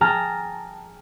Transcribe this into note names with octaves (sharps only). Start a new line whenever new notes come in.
G#4 G5 A5 A#5 F6 G6